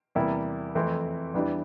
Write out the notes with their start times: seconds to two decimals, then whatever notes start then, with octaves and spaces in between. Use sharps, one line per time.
0.15 E2 C3 G3 A#3 E4
0.75 F2 E3 A3 C4 E4
1.34 E2 E3 G3 D4 G4